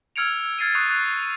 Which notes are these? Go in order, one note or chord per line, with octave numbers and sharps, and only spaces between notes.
E6 F6 G#6 C#7 D7 F7
F6 G#6 A6 C7 C#7 D#7
C#6 D#6 F#6 C7
F#6 C7
D#7